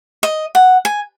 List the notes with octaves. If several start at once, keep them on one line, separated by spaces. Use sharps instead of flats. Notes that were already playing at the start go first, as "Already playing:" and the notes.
D#5
F#5
G#5